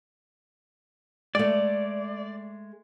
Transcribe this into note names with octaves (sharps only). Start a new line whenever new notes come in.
G#3 A3 D5